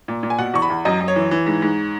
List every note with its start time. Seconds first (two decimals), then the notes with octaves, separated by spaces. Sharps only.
0.08 A#2
0.23 A#2
0.30 G#5
0.39 B2 F#5
0.54 E2 C#6
0.62 B5
0.70 E2
0.85 F#2 D#5
1.01 F#2
1.08 C#5
1.16 E3
1.31 E3
1.47 G#2
1.62 G#2